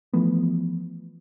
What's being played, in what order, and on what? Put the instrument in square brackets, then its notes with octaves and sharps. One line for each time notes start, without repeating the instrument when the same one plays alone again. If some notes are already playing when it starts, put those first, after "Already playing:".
[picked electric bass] E3 F3 A3 B3